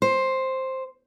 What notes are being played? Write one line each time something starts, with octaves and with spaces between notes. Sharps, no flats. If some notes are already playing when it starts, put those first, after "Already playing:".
C5